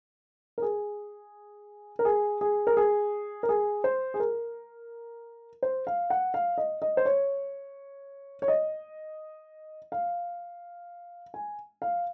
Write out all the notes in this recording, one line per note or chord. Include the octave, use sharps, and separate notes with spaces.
A#4
G#4
A#4
G#4
G#4
A#4
G#4
A#4
G#4
C5
G#4
A#4
C5
F5
F#5
F5
D#5
D#5
C5
C#5
C#5
D#5
F5
G#5
F5